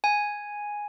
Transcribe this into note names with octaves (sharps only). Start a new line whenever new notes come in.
G#5